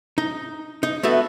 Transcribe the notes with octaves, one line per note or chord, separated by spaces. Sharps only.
D#4
D#4
A3 B3 F#4 E5